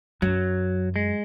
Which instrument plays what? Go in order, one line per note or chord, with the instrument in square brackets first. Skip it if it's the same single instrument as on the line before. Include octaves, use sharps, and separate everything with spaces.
[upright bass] F#2 [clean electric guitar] F#3
[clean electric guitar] G#3